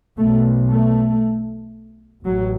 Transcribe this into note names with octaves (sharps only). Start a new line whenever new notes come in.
B1 B2 A3
A3
A1 F#3